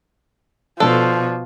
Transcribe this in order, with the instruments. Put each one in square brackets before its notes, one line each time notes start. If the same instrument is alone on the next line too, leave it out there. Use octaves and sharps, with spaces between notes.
[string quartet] B2 [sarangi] F3 [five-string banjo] D4 A4